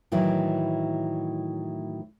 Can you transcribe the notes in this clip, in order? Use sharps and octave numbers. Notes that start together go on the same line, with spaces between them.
A2 D#3 E3 F#3 A3 E4